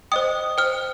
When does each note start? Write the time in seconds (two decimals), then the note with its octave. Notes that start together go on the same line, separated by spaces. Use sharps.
0.12 C5 D#5 G5 D#6
0.58 C5 G5 F6